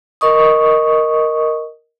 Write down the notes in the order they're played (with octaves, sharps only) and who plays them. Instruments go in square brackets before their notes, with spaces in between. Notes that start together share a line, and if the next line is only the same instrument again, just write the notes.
[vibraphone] A#4 D#5 C#6 D#6